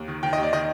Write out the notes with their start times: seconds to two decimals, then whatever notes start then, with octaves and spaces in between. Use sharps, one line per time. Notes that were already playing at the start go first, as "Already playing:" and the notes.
Already playing: D#2
0.08 D#3
0.23 D#3 G5
0.33 D#5
0.38 D#2
0.43 D5
0.53 D#3 D#5